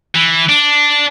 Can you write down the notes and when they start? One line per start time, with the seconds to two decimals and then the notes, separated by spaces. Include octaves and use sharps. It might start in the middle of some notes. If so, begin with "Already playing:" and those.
0.15 E3
0.49 D4